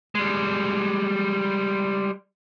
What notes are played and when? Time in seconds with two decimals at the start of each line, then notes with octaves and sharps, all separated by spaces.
0.15 G3 G#3